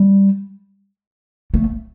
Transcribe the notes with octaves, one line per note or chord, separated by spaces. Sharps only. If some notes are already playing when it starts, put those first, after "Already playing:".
Already playing: G3
A3